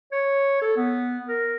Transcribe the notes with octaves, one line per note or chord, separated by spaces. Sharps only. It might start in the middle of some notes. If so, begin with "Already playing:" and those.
C#5
A4
B3
A#4